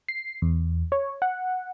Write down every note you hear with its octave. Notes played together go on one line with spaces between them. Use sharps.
C7
E2
C#5
F#5